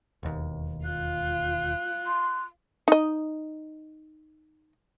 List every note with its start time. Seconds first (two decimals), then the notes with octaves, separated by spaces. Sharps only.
0.23 E1 D#2
0.84 F4 F#6
2.07 C6
2.88 D#4 D#5